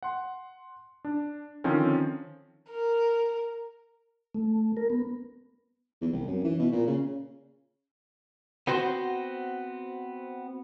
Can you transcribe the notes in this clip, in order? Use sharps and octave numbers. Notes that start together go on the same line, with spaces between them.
F#5 C6
D4
D3 D#3 F3 C4 C#4
A#4
A3
A#4
B3
E2
C2
F#2
E3
B2
A#2
C#3
B3 C4 F#4 C5